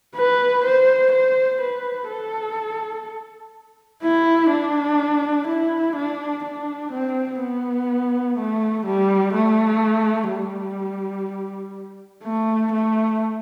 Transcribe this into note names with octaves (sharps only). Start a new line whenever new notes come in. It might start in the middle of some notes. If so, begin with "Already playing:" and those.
B4
C5
C5
B4
A4
E4
D4
E4
D4
D4
C4
B3
A3
G3
A3
G3
A3
A3